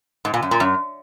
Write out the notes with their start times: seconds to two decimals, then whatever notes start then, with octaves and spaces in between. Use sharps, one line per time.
0.25 G#2
0.34 A#2
0.42 F#2
0.51 A#2
0.60 F#2